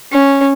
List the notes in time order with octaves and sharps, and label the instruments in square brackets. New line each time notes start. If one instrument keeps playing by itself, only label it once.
[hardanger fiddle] C#4